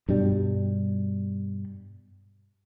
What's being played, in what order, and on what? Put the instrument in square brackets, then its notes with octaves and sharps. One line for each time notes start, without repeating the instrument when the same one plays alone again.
[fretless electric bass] G2 B2 G3